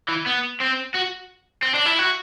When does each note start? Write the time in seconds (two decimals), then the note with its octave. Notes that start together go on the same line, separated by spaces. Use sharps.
0.08 E3
0.26 B3
0.60 C4
0.94 F#4
1.62 C4
1.74 D4
1.86 E4
1.99 F#4